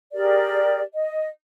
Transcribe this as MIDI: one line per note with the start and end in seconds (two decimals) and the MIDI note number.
0.13 0.80 67
0.13 0.80 68
0.13 0.80 70
0.13 0.80 74
0.93 1.27 75